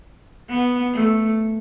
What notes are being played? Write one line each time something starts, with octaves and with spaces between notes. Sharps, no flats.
B3
A3